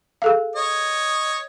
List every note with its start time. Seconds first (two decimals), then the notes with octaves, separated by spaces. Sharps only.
0.22 G#4 A4 F5
0.56 C#5 D#5